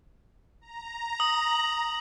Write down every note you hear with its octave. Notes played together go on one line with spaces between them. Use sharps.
A#5
D#6